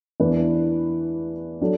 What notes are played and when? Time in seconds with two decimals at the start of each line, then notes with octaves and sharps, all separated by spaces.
0.20 E2 E3 D4 B4
1.61 F#3 D4 A4